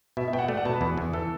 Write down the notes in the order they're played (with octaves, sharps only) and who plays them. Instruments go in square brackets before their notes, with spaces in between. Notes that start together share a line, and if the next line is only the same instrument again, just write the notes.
[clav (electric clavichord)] B2 [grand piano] E5
[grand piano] E5
[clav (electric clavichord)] B2 [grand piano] G5
[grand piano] F#5
[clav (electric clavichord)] A3 [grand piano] D5
[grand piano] F#5
[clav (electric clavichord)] B2 [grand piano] A5
[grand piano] B4
[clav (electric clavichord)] E2
E2
[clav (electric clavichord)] E3 [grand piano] A4